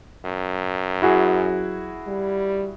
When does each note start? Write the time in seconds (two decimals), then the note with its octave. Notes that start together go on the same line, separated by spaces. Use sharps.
0.25 F#2
1.02 F#3 E4 F#4 G#4
2.07 G3